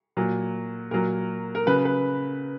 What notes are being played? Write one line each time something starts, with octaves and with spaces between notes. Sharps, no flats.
A#2 F#3
A#2 F#3 A#4
A#4
C#3 F#3 B4
B4